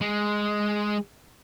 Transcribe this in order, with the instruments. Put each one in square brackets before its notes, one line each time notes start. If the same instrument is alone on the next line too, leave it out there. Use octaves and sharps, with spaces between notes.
[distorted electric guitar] G#3